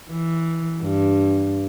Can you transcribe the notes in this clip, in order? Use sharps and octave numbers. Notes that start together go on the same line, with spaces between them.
E3
G2